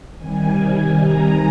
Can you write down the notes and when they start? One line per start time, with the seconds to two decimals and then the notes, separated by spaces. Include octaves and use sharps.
0.16 C3 D#3 G3 G#5
1.00 A#5